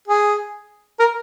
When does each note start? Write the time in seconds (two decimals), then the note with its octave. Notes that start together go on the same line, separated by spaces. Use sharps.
0.07 G#4
0.99 A#4